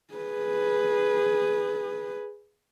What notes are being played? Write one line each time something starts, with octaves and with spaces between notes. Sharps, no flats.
G#4 B4